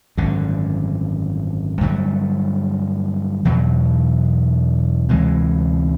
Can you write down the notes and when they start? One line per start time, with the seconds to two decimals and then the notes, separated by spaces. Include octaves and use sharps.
0.17 G#1 F#2 D3
1.81 G2 D3 F#3 A3
3.45 E2 B2 F#3
5.09 D2 C3 E3 G#3